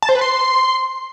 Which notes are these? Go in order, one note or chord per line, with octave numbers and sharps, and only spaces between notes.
A5
C5
B4
C6